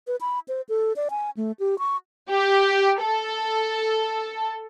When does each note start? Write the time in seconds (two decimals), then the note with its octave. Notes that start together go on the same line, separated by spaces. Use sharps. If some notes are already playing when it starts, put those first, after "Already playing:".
0.07 B4
0.21 B5
0.48 C5
0.69 A4
0.96 D5
1.10 G#5
1.37 A3
1.60 G4
1.79 C#6
2.29 G4
3.01 A4